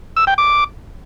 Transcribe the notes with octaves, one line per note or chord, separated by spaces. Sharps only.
E6
G5
D6